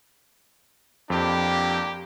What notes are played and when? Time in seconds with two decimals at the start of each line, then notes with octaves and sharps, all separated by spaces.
1.10 F2 A#3 D4 G4